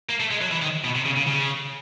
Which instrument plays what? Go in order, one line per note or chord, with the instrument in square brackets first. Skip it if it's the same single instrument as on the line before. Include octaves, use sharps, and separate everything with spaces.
[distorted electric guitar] A#3
A3
G#3
F#3
E3
D#3
B2
C3
C#3
C#3
C#3